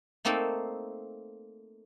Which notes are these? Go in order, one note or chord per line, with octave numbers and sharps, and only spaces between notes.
A3 A#3 C4 D#4 A4